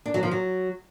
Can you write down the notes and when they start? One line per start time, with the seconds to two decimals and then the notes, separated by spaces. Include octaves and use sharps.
0.06 D4
0.14 F#3
0.23 F3
0.31 F#3